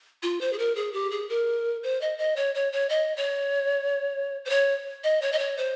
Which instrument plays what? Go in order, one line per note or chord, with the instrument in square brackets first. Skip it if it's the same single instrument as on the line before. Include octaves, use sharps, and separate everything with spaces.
[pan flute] F4
C5
G#4
A#4
G#4
G4
G#4
A#4
C5
D#5
D#5
C#5
C#5
C#5
D#5
C#5
C5
C#5
D#5
C#5
D#5
C#5
C5